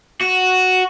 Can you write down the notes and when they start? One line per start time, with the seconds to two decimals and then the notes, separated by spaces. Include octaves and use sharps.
0.21 F#4